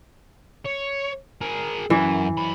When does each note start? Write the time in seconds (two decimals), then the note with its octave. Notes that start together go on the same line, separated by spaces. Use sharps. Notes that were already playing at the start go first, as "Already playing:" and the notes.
0.65 C#5
1.41 G#4 A#4
1.90 F#2 E3
2.38 F#2 B5